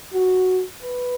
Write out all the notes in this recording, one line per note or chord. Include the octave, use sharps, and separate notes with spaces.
F#4
B4